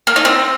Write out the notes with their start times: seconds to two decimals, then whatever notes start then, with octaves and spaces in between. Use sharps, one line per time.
0.07 A#3
0.16 D#4
0.25 C4